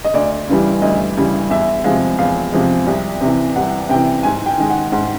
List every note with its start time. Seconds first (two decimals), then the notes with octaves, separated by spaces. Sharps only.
0.04 D#5
0.14 D2 D5
0.48 C#3 E3 G3
0.82 D2 D#5
1.17 C#3 E3 G3
1.50 E2 E5
1.84 C3 F3 G#3 F5
2.19 E2 F5
2.52 C3 F3 G#3
2.87 C2
3.21 C3 E3
3.56 C2 F#5
3.89 C3 E3 G5
4.23 G#2 G#5
4.46 G5
4.58 D#3 G#3
4.70 F#5
4.92 G#2 F#5